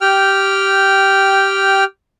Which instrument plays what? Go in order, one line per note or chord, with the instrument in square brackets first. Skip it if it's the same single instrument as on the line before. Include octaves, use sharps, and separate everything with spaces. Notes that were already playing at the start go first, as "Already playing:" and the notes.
[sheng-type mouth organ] G4 G5 F6